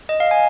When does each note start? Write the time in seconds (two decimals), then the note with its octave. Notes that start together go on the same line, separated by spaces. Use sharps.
0.09 D#5
0.20 F5
0.31 G#5